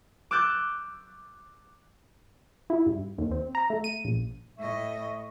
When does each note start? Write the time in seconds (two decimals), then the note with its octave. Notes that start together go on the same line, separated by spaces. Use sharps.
0.31 D6 E6 F#6 G6 A6
2.70 E4
2.86 G2
3.18 D#2
3.31 C4
3.55 A#5
3.70 A3
3.84 D#7
4.05 A#1
4.58 A2 D#5 E5 C#6